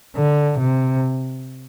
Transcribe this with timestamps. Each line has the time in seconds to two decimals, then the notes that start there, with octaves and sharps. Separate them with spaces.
0.16 D3
0.59 C3